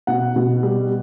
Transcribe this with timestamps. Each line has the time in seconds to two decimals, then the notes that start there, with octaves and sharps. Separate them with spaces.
0.07 B2 F#5
0.36 B2
0.63 G3